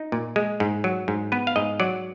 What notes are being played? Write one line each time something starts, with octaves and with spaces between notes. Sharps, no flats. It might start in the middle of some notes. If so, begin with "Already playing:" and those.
Already playing: D#4
A#2
G#3
G#2
F#3
G#2
B3 B4
F5
G#2 D#5
F#3 D5